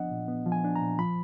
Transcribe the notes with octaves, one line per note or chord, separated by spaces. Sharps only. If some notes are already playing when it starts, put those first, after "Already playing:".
Already playing: F3 B3 D4 D#5 F#5
A#2
B3
F3
G#5
D4
A#5
A#2
F3 B5